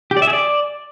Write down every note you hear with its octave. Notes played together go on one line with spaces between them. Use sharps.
G4
D5
E5
G#4
D5